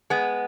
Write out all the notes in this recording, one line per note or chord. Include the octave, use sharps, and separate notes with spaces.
G#3 B3